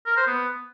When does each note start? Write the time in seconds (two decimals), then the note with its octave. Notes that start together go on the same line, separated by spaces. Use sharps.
0.06 A#4
0.17 C5
0.27 B3